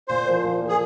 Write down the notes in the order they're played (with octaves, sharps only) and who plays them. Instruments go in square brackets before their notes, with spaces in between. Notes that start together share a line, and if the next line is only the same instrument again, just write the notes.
[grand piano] A#2 [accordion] C5
[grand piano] F3 A#3
A#2
F3 A#3
[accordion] G#4